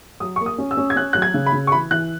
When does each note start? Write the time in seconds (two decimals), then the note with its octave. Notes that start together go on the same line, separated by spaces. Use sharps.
0.20 F#3 D#6
0.36 A#3 C#6
0.46 D#6
0.58 C#4
0.71 E6
0.77 C#4
0.90 G#6
0.96 C#4 F#6
1.13 F#3 F#6
1.22 G#6
1.34 C#3
1.46 B5
1.53 C#3
1.67 C#6
1.72 E3 B5
1.91 E3 F#6